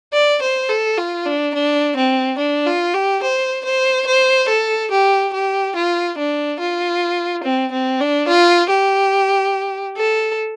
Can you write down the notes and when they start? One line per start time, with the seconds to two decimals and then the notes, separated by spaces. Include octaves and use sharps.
0.13 D5
0.42 C5
0.70 A4
0.98 F4
1.26 D4
1.55 D4
1.96 C4
2.39 D4
2.66 F4
2.94 G4
3.23 C5
3.65 C5
4.07 C5
4.49 A4
4.91 G4
5.33 G4
5.76 F4
6.18 D4
6.60 F4
7.44 C4
7.72 C4
8.01 D4
8.28 F4
8.70 G4
9.97 A4